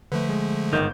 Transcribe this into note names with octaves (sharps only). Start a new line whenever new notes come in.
D3 F3 A3 B4
G#3
G1 G#2 D#3 G6